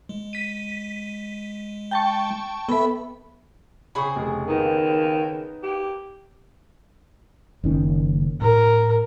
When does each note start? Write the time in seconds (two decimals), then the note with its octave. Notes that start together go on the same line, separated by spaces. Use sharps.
0.09 G#3
0.33 B6 D#7
1.91 G5 A5 C#6
2.69 B3 A4 E5 B5
3.95 C#3 C4 G#4 B5 C#6
4.16 F1
4.48 D#3 B3 D#4
5.63 G4
7.64 F#1 D#3 C#4
8.41 A2 A#4